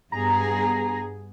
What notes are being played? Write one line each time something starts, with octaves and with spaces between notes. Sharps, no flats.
G2 B3 G#4 A#5